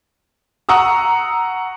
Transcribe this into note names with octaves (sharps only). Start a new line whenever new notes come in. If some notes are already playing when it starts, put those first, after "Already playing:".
F#5 A#5 C#6 D#6 E6